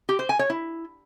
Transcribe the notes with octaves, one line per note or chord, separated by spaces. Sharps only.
G4
C5
G#5
C#5
E4